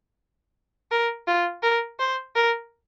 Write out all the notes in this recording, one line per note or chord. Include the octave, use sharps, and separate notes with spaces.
A#4
F4
A#4
C5
A#4